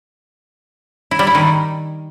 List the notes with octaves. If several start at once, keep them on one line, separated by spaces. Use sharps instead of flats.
E4
G3
E4
D#3